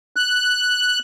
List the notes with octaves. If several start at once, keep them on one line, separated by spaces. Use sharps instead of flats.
F#6